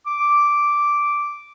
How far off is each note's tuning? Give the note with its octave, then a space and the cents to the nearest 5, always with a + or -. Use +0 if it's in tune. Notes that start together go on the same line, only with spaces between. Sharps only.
D6 -5